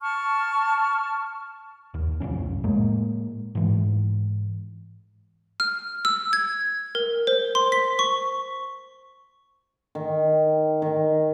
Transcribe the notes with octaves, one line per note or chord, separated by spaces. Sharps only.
A5 C#6 F6
D#2
F#1 C2 F2 C#4
A2 G#3 A#3
G#2 E3
F6
E6
G#6
A#4
C5
C6
B6
C#6
D#3
D#3